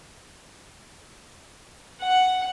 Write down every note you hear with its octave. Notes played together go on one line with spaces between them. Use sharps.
F#5